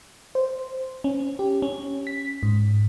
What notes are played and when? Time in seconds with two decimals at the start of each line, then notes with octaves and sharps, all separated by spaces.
0.35 C5
1.04 C#4
1.39 G4
1.62 C#4
2.07 B6
2.43 G#2